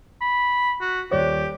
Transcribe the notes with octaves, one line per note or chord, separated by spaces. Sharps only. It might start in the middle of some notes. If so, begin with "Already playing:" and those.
B5
F#4
D#1 G4 C#5 D5